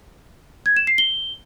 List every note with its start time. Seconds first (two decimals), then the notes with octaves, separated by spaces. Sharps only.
0.66 G#6
0.77 E7
0.87 C7
0.98 G7